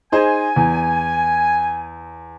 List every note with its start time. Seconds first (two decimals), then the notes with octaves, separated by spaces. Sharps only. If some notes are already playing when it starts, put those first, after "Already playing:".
0.12 D#4 G#4 C5 G#5
0.56 E2